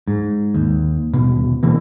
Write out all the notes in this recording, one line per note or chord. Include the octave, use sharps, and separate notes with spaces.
G#2
D#2
D#1 B2
B2 E3 A#3